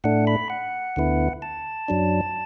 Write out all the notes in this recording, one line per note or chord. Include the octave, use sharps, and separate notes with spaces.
A2 A3 D4 F#5
B5
F#5
D2 D3 B3 E4
A5
F#2 F#3 D4